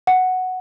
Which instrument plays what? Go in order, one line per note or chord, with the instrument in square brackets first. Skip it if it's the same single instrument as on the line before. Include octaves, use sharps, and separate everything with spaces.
[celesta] F#5